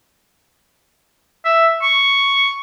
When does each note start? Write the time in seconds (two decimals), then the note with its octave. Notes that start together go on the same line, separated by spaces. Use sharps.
1.45 E5
1.82 C#6